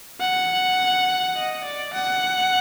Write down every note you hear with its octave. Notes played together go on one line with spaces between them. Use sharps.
F#5
D#5
D5
F#5